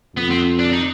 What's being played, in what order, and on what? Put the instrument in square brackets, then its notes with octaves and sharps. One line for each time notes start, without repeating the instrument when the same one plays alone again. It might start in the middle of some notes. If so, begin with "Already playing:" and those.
[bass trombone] F2 [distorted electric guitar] B3
[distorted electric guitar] C4
D4
D#4